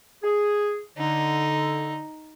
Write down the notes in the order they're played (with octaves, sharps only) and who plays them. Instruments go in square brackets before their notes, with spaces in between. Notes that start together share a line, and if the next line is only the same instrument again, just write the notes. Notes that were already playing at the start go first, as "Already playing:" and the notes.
[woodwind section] G#4
[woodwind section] D3 [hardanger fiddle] D#4